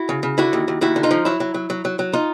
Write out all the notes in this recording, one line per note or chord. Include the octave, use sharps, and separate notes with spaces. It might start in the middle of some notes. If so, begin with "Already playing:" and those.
Already playing: E4 F#4
C#3
C#3
D3 E4 F#4
D#2
D#2
D#2 E4 F#4
D3
D#4 F4
F3
F#3 E4
F#3
F#3
F#3
F#3
F#3
D#4 F4